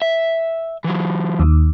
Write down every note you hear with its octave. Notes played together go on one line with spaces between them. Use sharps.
E5
E3 F#3
D#2